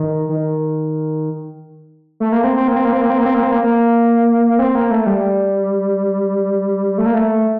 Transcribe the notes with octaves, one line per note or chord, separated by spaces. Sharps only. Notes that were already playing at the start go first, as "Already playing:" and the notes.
Already playing: D#3
D#3
A3
A#3
C4
C4
A#3
C4
A#3
C4
A#3
C4
A#3
C4
A#3
C4
A#3
A#3
C4
A#3
A3
G3
A3
A#3
A3